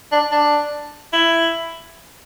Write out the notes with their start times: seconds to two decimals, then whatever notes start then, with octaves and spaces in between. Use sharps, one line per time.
0.12 D4
0.31 D4
1.13 E4